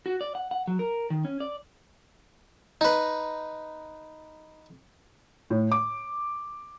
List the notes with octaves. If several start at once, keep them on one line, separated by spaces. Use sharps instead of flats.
F#4
D5
F#5
F#5
F#3
A#4
D#3
C#4
D5
D#4 B4
A2
D6